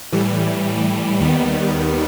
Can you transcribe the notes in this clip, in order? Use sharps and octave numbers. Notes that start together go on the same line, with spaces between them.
A2 E3 G3
D#2 D#3 G3 B3